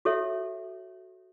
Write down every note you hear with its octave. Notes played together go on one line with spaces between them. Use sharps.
F#4 A4 C#5 E5